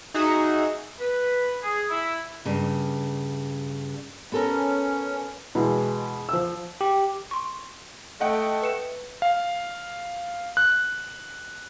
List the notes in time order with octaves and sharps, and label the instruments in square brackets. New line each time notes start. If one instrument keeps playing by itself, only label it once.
[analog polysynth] D#4 F#4 G#4 E5 F#5
[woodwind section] B4
G#4
E4
[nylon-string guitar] G2 C#3 A#3
[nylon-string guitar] B3 A4 A#4 [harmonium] C#4
[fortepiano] B2 E3 G#3
F3 E6
[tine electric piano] G4
[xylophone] C6 C#6
[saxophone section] A3 [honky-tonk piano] D#5 F#5 G5
[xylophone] B4 C#7 E7
[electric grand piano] F5
F#6